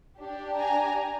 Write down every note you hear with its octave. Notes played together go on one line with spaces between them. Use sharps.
D4 G4
G#5 A#5